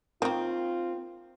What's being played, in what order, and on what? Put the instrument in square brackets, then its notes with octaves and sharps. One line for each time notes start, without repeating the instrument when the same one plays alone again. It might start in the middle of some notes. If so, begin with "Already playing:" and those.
[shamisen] D#3 A#3 [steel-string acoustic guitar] C4 [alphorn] F4